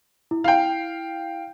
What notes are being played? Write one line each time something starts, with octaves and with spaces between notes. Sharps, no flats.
E4
F5 G5